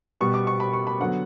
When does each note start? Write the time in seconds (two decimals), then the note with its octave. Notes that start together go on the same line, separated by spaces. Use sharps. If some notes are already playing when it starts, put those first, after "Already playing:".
0.21 B2 G3 B3 C#6
0.34 D6
0.47 C#6
0.60 B5
0.73 C#6
0.87 B5
1.00 D3 F#3 B3 F#5